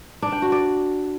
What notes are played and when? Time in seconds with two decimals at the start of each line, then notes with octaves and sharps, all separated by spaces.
0.22 D4
0.32 G5
0.42 F#4
0.52 D5